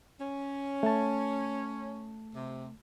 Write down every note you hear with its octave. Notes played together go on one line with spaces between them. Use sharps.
C#4
A3 A5
C3